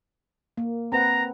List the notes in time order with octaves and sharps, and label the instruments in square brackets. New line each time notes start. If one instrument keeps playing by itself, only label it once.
[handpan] A#3
[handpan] C4 B4 F#5 [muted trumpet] A#5